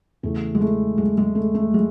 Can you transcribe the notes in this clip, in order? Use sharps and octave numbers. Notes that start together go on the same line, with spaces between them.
E2 C#3 E3 A3
G#3
A3
G#3
G#3
A3
A3
G#3